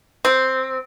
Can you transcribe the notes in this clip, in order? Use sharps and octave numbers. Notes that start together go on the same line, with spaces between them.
C4